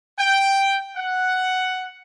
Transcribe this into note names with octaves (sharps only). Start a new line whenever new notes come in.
G5
F#5